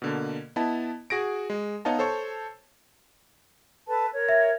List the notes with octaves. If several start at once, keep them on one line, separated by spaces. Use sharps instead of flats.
B2 D3 A#3
B3 E4 D#5 A5
F#4 G#4 A#6 D7
G#3
B3 D#4 C#5 D#5 F5 A5
A4 C5 C#5 A5 C#6
A4 B4 A5
A#4 C#5
E5